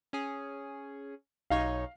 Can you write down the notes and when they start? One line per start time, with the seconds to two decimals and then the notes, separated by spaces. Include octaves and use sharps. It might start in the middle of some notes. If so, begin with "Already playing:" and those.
0.13 C#4 G#4
1.50 B1 D#4 C#5 F5